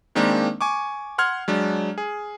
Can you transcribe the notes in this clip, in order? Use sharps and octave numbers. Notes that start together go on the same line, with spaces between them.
D#3 G#3 A#3 C4 D4
G#5 C#6 D6
F#5 C6 F6 G#6
F#3 G#3 D4
G#4